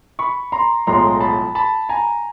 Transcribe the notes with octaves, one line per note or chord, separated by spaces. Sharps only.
B5 C#6
A#5 C6
B1 A2 F3 G#3 A#5 C6
A5 B5
A5 B5
G#5 A#5